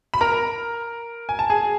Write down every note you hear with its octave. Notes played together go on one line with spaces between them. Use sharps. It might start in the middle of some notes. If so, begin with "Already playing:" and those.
B5
A#4 A#5
G#5
A5
G#4 G#5